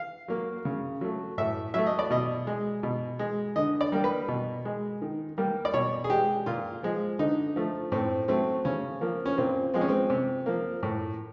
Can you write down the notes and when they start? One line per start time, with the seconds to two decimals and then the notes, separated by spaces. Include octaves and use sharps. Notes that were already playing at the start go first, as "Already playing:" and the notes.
Already playing: F5
0.28 F#3 A#3
0.65 C#3
1.01 F#3 A3
1.38 A2 E5
1.74 F#3 A3 E5
1.87 D#5
1.99 D5
2.10 B2 D#5
2.47 G#3
2.83 B2
3.19 G#3
3.56 D3 D#5
3.81 D5
3.92 G3 A#3
4.04 B4
4.28 B2
4.65 G#3
5.02 D#3
5.38 G3 A#3
5.65 D5
5.74 B2 C#5
6.04 G#4
6.10 G#3 G4
6.46 A#2 F4
6.83 F3 G#3
7.19 D3 D#4
7.56 F3 A3
7.92 A2 C4
8.28 F#3 A3 C4
8.65 C#3 C#4
9.01 F3 A#3
9.26 C#4
9.38 A#2 C4
9.74 F3 G#3 C4
9.81 C#4
9.89 C4
10.10 C3
10.46 F3 A#3
10.83 A2